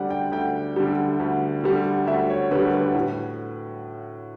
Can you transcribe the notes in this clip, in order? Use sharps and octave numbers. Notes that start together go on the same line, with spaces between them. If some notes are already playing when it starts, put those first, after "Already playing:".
Already playing: D2 D3 G3 D5 F#5
G5
D2 G5
D3 G3
D2
D3 G3
D2 E5
C#5
D3 G3 B4
B4
A2 B4